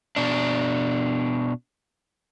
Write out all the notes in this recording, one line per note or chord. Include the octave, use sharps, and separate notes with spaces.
B2 D4